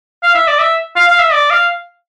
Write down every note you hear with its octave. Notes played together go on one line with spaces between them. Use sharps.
F5
E5
D5
E5
F5
F5
E5
D5
F5